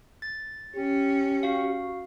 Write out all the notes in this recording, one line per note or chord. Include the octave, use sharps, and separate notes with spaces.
A6
C#4 G4
F#4 F5